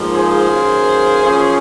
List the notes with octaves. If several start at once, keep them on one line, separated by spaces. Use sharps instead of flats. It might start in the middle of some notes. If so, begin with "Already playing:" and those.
Already playing: G#2 F3 A#3
G#4 C5
F#2 D#3 A#3
F#2 F3 A#3 C#4